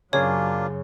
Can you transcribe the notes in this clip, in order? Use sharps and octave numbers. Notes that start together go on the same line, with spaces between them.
F#2 C#3 F#3 A#3 D4 F4 C#5